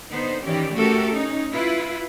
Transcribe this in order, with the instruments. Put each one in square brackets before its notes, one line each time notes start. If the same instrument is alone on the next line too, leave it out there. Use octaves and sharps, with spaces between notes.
[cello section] D3 B3 D#4 C5
D#3 E3 C#4 G4 D5
A3 C#4 F#4 G4 A4 A#4
C#4 D#4
E4 F4 B4